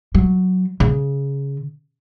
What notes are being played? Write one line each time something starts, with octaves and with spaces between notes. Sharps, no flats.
F#3
C#3